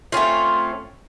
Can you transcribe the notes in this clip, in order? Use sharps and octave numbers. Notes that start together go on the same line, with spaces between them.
A3 C4 C#4 F4